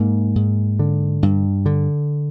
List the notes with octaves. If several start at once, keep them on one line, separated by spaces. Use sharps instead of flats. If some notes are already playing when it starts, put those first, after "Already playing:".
Already playing: G#2 A#3
G#2
D3
G2
D3